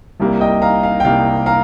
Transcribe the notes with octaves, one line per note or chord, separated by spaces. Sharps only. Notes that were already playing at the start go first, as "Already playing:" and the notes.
C2 C3 G3 A#3
D#5 G5
F5 A#5
F5
G5
C2 C3 G3 A#3 F5
F5 A#5